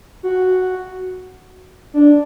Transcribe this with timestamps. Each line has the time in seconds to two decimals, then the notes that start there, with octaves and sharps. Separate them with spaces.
0.23 F#4
1.94 D4